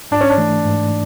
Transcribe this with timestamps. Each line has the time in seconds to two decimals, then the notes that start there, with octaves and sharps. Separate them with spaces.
0.11 G#2 D4
0.21 C#4
0.30 D4
0.38 E3 A3
0.65 G#2